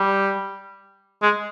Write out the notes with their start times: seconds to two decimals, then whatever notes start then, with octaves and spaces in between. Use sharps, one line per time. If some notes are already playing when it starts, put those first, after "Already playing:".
Already playing: G3
1.23 G#3